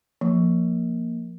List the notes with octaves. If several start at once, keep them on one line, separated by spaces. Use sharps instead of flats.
F3 A#3